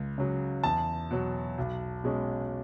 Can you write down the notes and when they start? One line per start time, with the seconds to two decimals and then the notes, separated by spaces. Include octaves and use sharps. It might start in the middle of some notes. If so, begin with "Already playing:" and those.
Already playing: C#2
0.18 C#3 F#3
0.63 E2 A5
1.11 B2 F#3
1.58 B1
2.04 B2 G#3 C#4